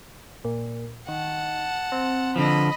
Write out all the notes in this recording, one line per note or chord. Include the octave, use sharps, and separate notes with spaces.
A#2
D#3 F#5 A5
C4
D3 F3 D#5 B5